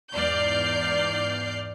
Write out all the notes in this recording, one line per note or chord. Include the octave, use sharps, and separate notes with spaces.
E2 G#2 D5 F6 G6 C7